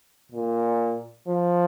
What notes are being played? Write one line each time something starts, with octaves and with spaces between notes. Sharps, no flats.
A#2
F3